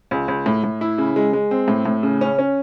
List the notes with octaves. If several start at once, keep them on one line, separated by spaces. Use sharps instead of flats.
C#2
C#2
A2
A2
E4
C#3
G#3
G#3
C4
A2
A2
C#3
C#4
C#4